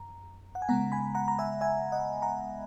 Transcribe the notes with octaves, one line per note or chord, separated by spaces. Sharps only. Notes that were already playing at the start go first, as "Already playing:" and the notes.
Already playing: F#2 A#5
F#5
G#5
C#3 G#3 B3 F#5 A#5
G#5 B5
F#5 A#5
A#5
E5 G#5
E5 G#5
D#5 F#5
F#5 A#5